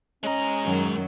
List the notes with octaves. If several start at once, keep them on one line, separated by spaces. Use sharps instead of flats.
G#3 C#4 D#5 A#5
F#2 D#3 F#3